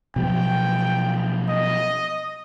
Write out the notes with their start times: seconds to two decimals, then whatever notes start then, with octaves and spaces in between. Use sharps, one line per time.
0.16 B2 F3 F#3 G5
1.49 D#5